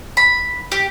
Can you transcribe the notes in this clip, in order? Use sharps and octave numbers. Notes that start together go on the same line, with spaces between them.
B5
G4